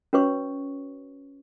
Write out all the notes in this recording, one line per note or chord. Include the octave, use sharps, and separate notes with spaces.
C#4 F#4 B4 C#5 C#6